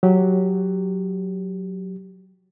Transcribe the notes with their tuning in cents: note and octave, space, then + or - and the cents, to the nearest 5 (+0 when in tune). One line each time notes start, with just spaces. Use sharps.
F#3 +0 G4 +0